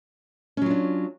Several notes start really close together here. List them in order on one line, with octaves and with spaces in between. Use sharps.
C#4 F#3 F4 D4